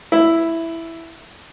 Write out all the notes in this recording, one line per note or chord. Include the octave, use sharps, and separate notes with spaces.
E4